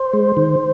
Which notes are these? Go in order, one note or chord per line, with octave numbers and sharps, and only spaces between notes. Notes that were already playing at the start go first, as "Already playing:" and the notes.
Already playing: C5
G#3
D#3